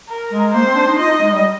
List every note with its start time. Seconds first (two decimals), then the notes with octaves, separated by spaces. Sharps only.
0.09 A#4
0.31 G#3
0.54 A#3 C5
0.65 C4
0.75 D4
0.87 D#4
0.99 F4 D#5
1.09 D#4
1.21 G#3
1.32 G3